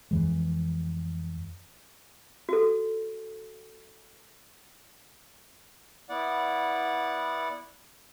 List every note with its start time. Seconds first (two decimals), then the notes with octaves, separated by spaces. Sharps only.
0.11 F2 E3 G#3
2.49 F#4 A4
6.09 B3 E4 D5 F#5